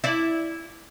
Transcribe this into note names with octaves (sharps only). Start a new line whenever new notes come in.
E4 D5